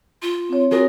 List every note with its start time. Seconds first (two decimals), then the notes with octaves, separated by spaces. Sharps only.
0.22 F4
0.49 C4 C#5
0.71 F4 F#4 G#4 A#4